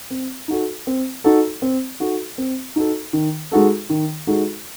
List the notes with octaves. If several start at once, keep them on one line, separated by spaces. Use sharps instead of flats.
C4
D#4 F#4 A4
C4
D#4 F#4 A4
C4
D#4 F#4 A4
C4
D#4 F#4 A4
D#3
G#3 D#4 F#4 A4
D#3
G#3 D#4 F#4 A4